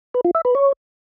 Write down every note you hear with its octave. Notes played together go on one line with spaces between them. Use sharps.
B4
F4
E5
B4
C#5